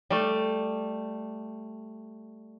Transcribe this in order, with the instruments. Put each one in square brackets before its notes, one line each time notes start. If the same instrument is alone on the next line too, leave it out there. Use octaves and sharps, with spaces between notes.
[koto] G3 A3